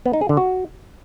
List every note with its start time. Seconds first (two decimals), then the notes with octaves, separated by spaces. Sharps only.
0.06 B3
0.13 D#4
0.21 G#4
0.29 D3
0.37 F#4